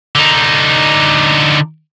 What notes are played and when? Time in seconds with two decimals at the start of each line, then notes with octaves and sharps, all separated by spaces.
0.16 D3 D#4